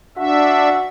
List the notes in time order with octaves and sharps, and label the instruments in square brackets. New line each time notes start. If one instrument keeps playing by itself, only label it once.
[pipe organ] D4 E5 [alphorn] F#4